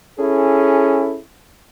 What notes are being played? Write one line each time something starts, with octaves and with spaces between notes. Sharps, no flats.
C#4 E4 G#4 A4